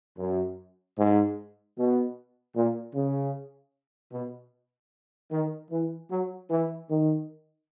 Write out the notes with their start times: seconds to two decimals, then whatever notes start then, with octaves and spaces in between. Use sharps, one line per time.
0.18 F#2
0.97 G#2
1.77 B2
2.55 A#2
2.95 C#3
4.12 B2
5.31 D#3
5.71 E3
6.10 F#3
6.50 E3
6.89 D#3